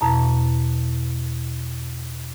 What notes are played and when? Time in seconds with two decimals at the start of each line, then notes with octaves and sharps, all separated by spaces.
0.01 E2 B2 A5 A#5